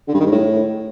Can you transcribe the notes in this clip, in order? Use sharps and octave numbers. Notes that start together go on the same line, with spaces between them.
D3
G2
D#3
G#2
A2